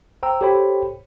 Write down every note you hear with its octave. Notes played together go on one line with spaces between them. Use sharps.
C5 G5 A#5 E6
G4 A4 C5 C#5 G5 B5